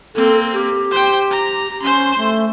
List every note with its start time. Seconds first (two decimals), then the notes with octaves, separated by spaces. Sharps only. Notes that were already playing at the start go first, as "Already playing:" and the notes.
0.15 A#3 C4 A4
0.53 G4
0.91 C5 G5
1.31 A#5
1.82 C#4 C5 C6
2.18 A3